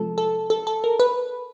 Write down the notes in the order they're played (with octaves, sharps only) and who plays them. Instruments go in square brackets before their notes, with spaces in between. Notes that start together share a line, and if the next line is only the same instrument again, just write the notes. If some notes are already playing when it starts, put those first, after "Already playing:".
Already playing: [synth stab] C3 F3 G#3 A4
A4
A4
A4
A#4
B4